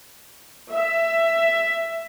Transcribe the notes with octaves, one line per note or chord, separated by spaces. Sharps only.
E5